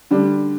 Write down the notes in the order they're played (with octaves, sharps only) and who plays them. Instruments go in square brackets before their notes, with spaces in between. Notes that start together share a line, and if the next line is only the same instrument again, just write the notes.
[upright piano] D3 G3 D4